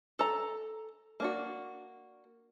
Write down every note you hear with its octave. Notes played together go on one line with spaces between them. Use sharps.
A4 A#5
A#3 D4 F#4